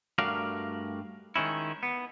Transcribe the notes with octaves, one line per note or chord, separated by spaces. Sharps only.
G2 A3 F#4 A#4 D5 F5
D#3 G#3 C#4 E4
B3